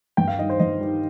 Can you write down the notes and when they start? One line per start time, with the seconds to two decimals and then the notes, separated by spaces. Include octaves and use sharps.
0.17 G2 G5
0.28 F5
0.38 D#3 D#5
0.42 G3
0.50 C5
0.60 G2 D#5
0.81 D#3 G3